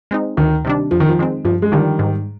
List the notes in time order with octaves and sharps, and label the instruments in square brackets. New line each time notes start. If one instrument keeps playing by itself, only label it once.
[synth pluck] G#3 C4 D#4
[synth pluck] D2 [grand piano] D#3
[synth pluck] C3 D#3 G3 D4
[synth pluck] F2 [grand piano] F3
[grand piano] D#3
F3
[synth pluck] D#3 G#3 C4
[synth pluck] G2 [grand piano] F3
[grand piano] G#3
[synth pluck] D3 F3 [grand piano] D#3 G3
[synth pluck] G#2